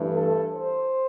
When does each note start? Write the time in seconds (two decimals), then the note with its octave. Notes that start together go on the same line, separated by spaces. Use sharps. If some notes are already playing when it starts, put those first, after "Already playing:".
Already playing: G2 E3 A3
0.13 A4
0.53 C5